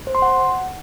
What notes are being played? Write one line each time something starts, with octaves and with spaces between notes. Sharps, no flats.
C5
C6
F#5